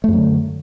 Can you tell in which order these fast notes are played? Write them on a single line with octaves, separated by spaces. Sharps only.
A3 F#2 F#3 D3